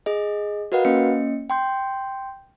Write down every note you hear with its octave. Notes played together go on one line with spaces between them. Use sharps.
G#4 D#5
F#4 A#4 B4 D#5 F5 F#5
A#3 C#4 D#5 C#7
G5 C6 G6